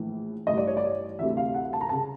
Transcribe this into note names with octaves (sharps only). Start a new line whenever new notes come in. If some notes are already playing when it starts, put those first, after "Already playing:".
Already playing: A#1 A2 E3
A1 G2 E3 D#5
D5
C#5
D5
D2 C3 E3 E5
F5
F#5
A5
A#5
C#3 A5